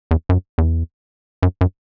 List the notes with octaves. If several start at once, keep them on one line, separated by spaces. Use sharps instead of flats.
E2
F#2
E2
F#2
F#2